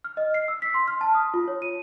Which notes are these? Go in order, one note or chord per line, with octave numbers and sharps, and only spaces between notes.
F6
D#5
C7
E6
B6
C6
F6
A5
D#6
F4
C#5
D#7